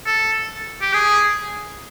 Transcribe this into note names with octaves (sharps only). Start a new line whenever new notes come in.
A4
G4
G#4